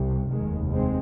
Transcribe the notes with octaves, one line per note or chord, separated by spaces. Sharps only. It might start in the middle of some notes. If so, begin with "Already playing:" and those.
Already playing: C2 C3
F1 D#2 D#3 G#3
G#3 C4